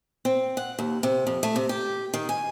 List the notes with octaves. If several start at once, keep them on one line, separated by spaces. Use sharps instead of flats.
C4
F#5
D#2
C3
F2
A3
C3
G4
D#3
G#5